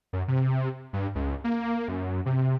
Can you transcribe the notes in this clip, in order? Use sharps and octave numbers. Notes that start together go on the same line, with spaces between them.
F#2
C3
G2
C#2
A#3
F#2
C3